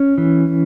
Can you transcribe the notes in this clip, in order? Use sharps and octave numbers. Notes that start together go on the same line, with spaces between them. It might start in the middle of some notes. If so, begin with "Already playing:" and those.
Already playing: C#4
E3